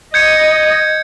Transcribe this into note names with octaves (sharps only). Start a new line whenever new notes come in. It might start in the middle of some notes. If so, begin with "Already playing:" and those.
D#5 G6 G#6 C#7